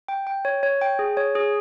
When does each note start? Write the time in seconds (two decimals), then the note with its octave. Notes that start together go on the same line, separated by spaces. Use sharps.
0.08 G5
0.27 G5
0.45 C#5
0.63 C#5
0.81 G5
0.99 G#4
1.17 C#5
1.35 G#4